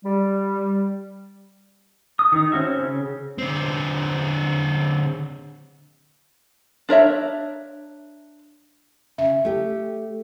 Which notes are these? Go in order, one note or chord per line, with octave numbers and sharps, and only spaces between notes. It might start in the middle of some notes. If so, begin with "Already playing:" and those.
G3
D#6
D#3 D#4
C4 C#4 F#4 E5
C#3
D3 C4
D4 A#4 C#5 E5
C#3 E5
A3 G4